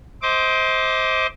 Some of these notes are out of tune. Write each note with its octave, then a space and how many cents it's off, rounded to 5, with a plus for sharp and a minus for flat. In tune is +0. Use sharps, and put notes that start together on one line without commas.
C5 +0 D#5 +40 D6 +0